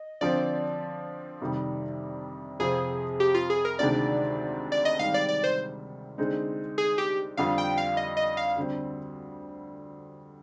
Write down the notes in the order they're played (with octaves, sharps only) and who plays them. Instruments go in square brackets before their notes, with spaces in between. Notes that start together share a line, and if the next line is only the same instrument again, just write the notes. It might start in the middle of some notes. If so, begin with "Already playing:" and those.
Already playing: [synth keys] D#5
[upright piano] D3 F3 C4 [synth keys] D5
[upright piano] F2 C3 D#3 G3
[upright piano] F2 C3 F3 C4 [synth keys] G#4
[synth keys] G4
F4
G#4
A#4
[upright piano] D2 C3 D#3 G#3 D4 [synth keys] D5
[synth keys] D5
D#5
[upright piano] G#2 D#3 G3 C4 [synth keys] F5
[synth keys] D5
D5
C5
[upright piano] D3 G#3 C4 D#4
[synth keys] G#4
G4
[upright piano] F2 D3 G3 D4 F4 [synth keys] F5
[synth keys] G5
F5
D#5
D#5
F5
[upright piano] D2 D3 G3 C4